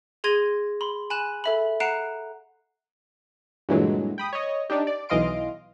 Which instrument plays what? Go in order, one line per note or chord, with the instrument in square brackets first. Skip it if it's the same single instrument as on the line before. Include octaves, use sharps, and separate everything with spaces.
[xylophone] G#4 C6 G#6 A#6 D#7
B5 C6
G#5 B5 F#6 E7
A4 E5 B5
F#5 A#5 F#6 C7 D7 E7
[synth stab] G2 A#2 D3 E3 F#3 G#3
G5 B5 D#6
C#5 D#5
D4 D#4 G4
D5
B1 E3 D#5 F5 C6 D7